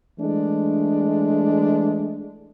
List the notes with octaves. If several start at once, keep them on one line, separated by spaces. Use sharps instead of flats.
E3 G#3 A3 D4